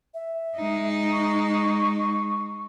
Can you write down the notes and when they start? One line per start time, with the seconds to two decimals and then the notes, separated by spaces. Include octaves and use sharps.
0.14 E5
0.57 G#3 D#4
1.13 C#6